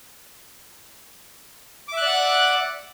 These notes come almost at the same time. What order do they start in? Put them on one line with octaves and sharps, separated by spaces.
D6 E5 F#6 D5 F#5